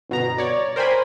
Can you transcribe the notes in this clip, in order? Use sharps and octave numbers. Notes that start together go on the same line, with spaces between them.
G1 B2 A#5
C#5 D5
A#4 C5 G5 G#5 B5